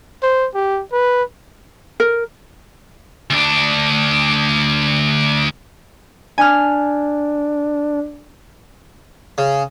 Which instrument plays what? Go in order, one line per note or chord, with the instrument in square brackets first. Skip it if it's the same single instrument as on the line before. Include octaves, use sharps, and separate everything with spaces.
[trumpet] C5
G4
B4
[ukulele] A#4
[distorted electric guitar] D2 D4
[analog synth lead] D4 [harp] G#5 F6
[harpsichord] C#3